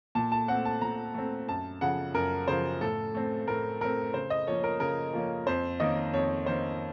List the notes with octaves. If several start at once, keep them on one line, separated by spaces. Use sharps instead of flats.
A#2 A5
A5
A3 C4 F#5
A5
A#2 A#5
A3 C4
F#2 A5
C#3 F3 F#5
F#2 A#4
C#3 F3 C5
A2 A4
A3 C4
A2 A#4
A3 C4 A#4
C#3 C5
D#5
F3 A#3 C#4 C#5
A#4
C#3 A#4
F3 A#3 C#4
F2 C5
D#3 A#3 C#4 D#5
F2 C#5
D#3 A#3 C#4 C5